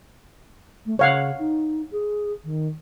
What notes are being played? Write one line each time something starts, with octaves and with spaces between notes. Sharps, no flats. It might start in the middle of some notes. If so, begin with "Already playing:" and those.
A3
C#3 C#5 F5 F#5
D#4
G#4
D#3